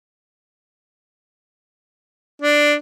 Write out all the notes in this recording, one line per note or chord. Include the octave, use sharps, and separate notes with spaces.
D4